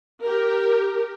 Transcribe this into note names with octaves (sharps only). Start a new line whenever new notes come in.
G4 A#4